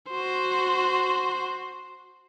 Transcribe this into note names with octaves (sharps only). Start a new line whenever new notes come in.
F#4 C5